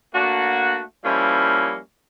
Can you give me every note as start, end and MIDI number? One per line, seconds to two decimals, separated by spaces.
0.14 0.82 57
0.14 0.82 58
0.14 0.82 62
0.14 0.82 66
1.05 1.79 53
1.05 1.79 55
1.05 1.79 58
1.05 1.79 61
1.05 1.79 64